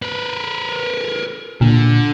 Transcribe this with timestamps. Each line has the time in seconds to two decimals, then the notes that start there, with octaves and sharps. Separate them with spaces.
0.02 A#4 B4
1.61 A#2 D3